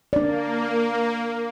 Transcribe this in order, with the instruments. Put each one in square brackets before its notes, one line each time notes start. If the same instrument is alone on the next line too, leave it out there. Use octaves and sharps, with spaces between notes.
[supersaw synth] A#3 [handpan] D4 D5